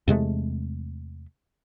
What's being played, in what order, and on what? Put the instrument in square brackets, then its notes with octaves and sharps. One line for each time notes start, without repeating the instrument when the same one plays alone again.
[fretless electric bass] E2 C3 G#3 A3